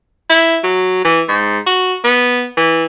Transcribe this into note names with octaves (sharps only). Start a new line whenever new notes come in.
E4
F#3
E3
G#2
F#4
B3
E3